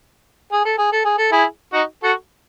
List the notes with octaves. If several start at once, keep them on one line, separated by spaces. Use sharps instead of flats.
G#4
A4
G#4
A4
G#4
A4
E4 G#4
D#4 F#4
F#4 A4